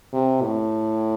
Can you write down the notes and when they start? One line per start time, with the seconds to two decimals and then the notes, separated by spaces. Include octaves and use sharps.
0.13 C3
0.42 A2